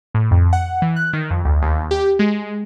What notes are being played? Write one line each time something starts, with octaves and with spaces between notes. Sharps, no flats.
A2
F2
F#5
E3
F#6
D#3
F2
D2
D#2
G4
G#3